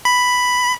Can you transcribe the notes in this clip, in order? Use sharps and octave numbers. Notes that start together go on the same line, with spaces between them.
B5